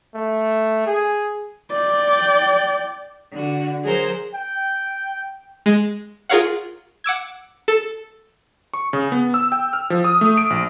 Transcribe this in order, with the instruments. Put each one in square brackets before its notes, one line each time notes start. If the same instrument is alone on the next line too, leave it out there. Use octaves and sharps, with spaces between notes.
[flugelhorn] A3
G#4
[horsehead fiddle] D5 G5
[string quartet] D3 F#4
F#3 G#4 A#4 C5
[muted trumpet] G5
[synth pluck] G#3
F4 G#4 A#4 C#5 F5 F#5
F#5 D6 E6 G#6
A4
[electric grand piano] C#6
C#3
B3
E6
G5
F6
F3
D#6
A3
D7
A#1